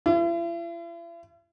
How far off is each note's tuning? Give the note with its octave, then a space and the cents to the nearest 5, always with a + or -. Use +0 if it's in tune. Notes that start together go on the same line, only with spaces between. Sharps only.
E4 +45